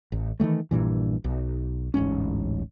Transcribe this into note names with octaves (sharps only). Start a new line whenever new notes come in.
A1
D#3 E3 G3 A3
A#1 G2 A#2 E3
B1
D1 A1 G#2 C#4